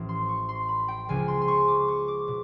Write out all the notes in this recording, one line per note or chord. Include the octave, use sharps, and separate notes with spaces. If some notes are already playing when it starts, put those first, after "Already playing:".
Already playing: A1 A2 F3
C6
C#6
C6
B5
G5
C#2 C#3 F3 G#5
C6
C6
C#6
D6
C#6
D6
B2